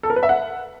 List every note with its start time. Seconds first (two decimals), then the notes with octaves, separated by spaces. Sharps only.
0.03 A4
0.10 A#4
0.16 B4
0.23 E5
0.29 F#5